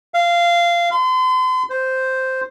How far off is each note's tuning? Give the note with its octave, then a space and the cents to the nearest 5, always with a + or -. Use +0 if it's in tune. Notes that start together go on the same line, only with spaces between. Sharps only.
F5 -15
C6 -40
C5 -5